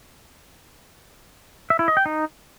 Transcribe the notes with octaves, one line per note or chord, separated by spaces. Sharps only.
E5
E4
D#5
G5
D#4